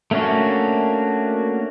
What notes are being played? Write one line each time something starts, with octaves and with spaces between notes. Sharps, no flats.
A3 A#3 C#4 D4 F#4